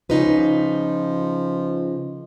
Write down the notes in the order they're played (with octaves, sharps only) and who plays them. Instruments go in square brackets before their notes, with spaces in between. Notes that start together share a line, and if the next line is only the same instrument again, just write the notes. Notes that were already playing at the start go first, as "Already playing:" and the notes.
[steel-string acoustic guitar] C#3 D#4 B4 [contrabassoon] F3